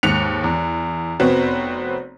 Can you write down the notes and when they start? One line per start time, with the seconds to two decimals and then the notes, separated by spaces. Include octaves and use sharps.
0.03 D#2 G#2 F#6 C#7 F7
0.44 E2
1.20 F1 B3 C4 F#4 C#5